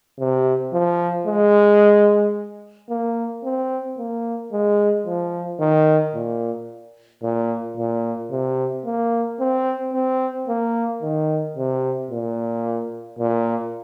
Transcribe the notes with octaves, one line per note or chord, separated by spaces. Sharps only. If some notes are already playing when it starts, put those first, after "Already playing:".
C3
F3
G#3
A#3
C4
A#3
G#3
F3
D#3
A#2
A#2
A#2
C3
A#3
C4
C4
A#3
D#3
C3
A#2
A#2